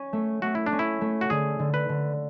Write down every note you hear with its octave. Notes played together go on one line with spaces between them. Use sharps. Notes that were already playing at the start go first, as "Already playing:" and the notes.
Already playing: C#4
A3
A3 F#4
E4
D4
C#4
E4
A3
F#4
D3 G#4
D3
B4
D3